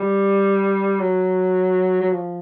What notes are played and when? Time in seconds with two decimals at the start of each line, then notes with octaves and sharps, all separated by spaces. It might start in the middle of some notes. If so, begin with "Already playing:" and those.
Already playing: G3
1.00 F#3
2.01 F#3
2.11 F3